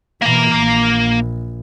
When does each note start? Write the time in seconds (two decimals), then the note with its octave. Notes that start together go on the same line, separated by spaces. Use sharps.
0.22 B2 E3 A#3 A#5
0.53 A#1